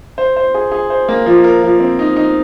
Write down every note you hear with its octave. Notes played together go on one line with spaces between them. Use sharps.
C5
C5
G#4
G#4
C5
A#3
F3
A#4
F3
C4
D#4
D#4